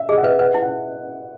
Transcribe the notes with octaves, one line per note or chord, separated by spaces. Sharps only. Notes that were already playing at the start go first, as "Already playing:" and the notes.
Already playing: E5
G#4 D#5
F#5
B4 E5
B4 F#5
E4
F#5